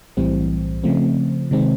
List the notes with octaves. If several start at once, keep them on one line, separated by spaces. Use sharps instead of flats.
B1 A2 E3 G3 C4
C#3 F3 A3 C4
C3 D#3 G#3 C4